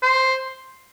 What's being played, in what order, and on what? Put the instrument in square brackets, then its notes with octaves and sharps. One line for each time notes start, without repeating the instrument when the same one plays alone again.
[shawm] C5